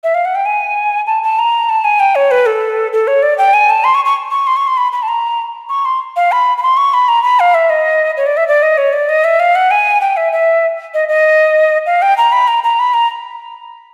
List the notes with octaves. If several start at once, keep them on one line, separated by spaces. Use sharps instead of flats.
E5
F5
F#5
G5
G#5
A5
A5
A#5
A5
G#5
G5
C#5
B4
A4
A4
C#5
D5
G5
G#5
A5
C6
C#6
C#6
C#6
C6
C#6
C6
B5
B5
A5
A#5
C#6
C6
F5
B5
B5
C6
C#6
B5
A#5
B5
F5
E5
D#5
C#5
D5
E5
D5
D#5
C#5
D5
D#5
E5
F5
F#5
G#5
G5
E5
E5
D#5
D#5
F5
G5
A#5
B5
A#5
A#5
B5
A#5